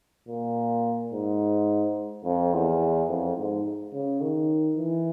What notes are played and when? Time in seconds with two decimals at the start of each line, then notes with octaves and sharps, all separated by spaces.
0.28 A#2
1.13 G#2
2.25 F2
2.53 E2
3.09 F2
3.37 G#2
3.93 C#3
4.21 D#3
4.77 E3